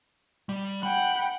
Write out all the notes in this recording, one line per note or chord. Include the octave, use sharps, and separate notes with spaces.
G3
F#5 G5 B5